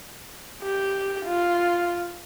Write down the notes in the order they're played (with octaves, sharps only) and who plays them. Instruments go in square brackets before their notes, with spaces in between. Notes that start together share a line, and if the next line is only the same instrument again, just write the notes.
[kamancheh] G4
F4